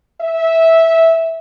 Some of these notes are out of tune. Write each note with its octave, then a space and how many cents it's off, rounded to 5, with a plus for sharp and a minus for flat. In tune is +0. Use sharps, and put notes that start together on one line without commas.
E5 -10